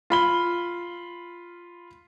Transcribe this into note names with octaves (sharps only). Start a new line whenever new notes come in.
F4 B5 G7